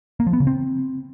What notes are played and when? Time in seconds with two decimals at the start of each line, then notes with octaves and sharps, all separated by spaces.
0.20 A#3
0.27 F3
0.33 B3
0.40 C#3
0.47 C4